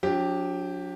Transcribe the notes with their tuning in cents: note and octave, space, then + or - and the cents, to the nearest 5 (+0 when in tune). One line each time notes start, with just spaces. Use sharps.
F#3 -40 D4 -25 G4 +0